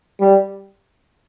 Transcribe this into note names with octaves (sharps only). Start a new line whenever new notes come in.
G3